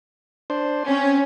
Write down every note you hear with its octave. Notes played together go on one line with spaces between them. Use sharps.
D4 C5
C4 C#4